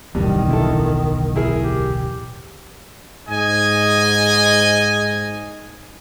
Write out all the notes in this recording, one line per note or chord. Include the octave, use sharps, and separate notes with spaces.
D1 B1 E2 G2 D#3
D3 E4 A4
E4 G#4 A#4
G4
G#2 D#5 G#5